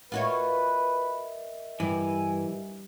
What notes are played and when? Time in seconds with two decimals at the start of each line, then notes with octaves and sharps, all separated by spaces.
0.12 F4 F#4 A#4 B4 C#5 D#5 E5
1.80 G2 E3 G#5